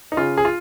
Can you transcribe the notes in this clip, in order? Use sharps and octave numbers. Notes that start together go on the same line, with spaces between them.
D#4
C#3 F4
G#4
F4